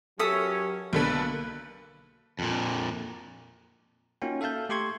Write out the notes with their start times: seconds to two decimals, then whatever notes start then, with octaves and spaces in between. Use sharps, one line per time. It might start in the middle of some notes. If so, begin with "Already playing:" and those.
0.19 F#3 C#4 G4 A4 A#4 E5 D#6
0.93 B1 D3 A#3 A4 B4
2.39 F2 A#2
4.22 A#3 C#4 D#4 F4 F#4 G5
4.41 A4 E5 F5 A5 G6
4.69 A3 G4 G5 C6 C#6 G#6